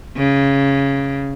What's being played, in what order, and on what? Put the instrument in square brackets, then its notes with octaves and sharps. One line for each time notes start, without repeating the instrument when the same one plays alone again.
[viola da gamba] C#3